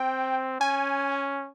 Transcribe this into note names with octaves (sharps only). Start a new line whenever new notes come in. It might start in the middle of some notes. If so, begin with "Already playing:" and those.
Already playing: C4 G5
C#4 G#5